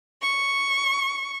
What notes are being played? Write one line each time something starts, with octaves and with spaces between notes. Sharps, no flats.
C#6